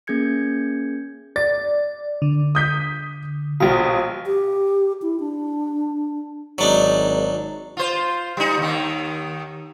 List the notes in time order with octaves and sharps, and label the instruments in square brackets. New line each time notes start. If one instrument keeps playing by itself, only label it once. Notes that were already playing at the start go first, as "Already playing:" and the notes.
[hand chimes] A#3 C#4 G#4 G6 G#6 C#7
[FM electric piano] D5 [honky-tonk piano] A6
[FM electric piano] D3
[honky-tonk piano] D#6 G6 B6
[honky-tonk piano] A#1 B2 [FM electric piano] F5
[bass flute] G4
E4
D4
[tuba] G#1 [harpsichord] F#3 D4 D#4
[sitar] F4 C5
G3 D#4
D#2 D#3